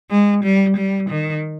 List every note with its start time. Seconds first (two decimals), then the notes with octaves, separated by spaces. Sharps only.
0.10 G#3
0.43 G3
0.77 G3
1.10 D#3